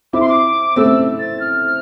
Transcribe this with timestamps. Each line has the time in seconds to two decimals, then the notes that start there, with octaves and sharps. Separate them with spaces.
0.13 C4 E4 D6
0.21 C6
0.29 D6
0.76 A3 C4 E6
1.19 A6
1.40 F6